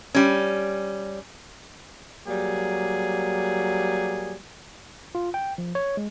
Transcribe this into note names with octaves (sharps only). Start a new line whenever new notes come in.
G3 C#4
F#3 G3 A#3 G#4
F4
G5
F3
C#5
G#3